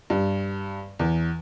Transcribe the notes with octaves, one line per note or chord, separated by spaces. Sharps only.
G2
E2